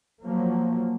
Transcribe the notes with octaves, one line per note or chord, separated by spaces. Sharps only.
F3 F#3 A#3